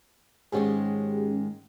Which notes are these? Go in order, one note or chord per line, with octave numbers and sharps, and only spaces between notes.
G#2 D#3 G#3 C#4 G4 G#4